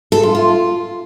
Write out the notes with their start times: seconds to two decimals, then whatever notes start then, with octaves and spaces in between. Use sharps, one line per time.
0.12 A4
0.23 F4
0.35 F4